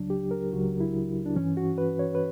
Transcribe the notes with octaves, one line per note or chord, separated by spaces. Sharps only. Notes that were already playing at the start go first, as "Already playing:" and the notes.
Already playing: C#2 C#3 F#3 D4
G4
A#4
C#2 C#3 F#3 F#4
E4
D4
G2 E3 C#4
F#4
B4
C#5
B4